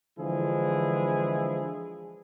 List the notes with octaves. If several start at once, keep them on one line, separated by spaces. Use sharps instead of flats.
D3 E3 F3 G#3 E4 G#4